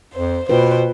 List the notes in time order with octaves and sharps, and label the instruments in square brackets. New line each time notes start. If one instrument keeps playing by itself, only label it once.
[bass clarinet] F2 [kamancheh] C5
[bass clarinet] B2 [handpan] A#3 F4 B4 [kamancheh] C5 G5